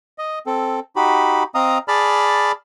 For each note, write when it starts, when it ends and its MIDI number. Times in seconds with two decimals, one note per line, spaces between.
0.18 0.39 75
0.47 0.80 60
0.47 0.80 69
0.96 1.43 63
0.96 1.43 66
0.96 1.43 67
0.96 1.43 83
1.55 1.78 60
1.55 1.78 75
1.55 1.78 77
1.55 1.78 82
1.55 1.78 87
1.88 2.52 68
1.88 2.52 74
1.88 2.52 81
1.88 2.52 83
1.88 2.52 89